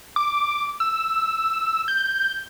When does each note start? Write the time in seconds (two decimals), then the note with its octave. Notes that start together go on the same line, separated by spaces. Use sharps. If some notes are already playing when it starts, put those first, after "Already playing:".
0.16 D6
0.80 E6
1.88 G6